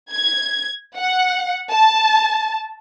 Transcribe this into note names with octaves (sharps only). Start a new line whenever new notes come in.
G#6
F#5
A5